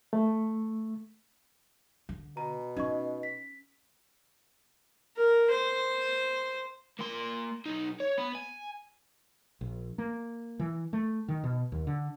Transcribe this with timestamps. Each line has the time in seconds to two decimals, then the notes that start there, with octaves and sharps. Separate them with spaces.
0.13 A3
2.09 D3
2.37 B2 A#5
2.77 C#4 D#4 D#5 C#6
3.23 B6
5.16 A#4
5.51 C5
6.99 A#3 C6
7.66 B1 D#4
8.00 C#5
8.18 B3
8.35 G#5
9.61 A#1
9.98 A#3
10.59 E3
10.93 A3
11.28 D#3
11.44 B2
11.72 D#2
11.87 D3